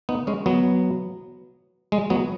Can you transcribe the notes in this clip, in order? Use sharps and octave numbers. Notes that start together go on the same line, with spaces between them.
B3 D#4
G#3 C#4
F#3 B3
G#3
F#3 B3